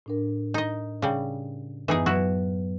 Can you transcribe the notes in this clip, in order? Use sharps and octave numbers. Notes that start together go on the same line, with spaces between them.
A2 D4 A#4
D#4 D#5
C#3 G3
F#2 E3 B3 D#4 G#4
F#3 E4 F#4 B4